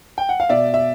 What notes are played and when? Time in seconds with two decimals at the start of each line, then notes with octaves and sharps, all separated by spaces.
0.18 G5
0.29 F#5
0.40 F5
0.49 B2 D5 E5
0.74 E5